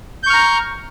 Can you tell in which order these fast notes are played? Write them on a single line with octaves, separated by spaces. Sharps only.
G6 C#6 F6 A#5